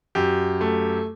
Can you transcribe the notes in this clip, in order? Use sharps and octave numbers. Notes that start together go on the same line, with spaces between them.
F#2 G4
A3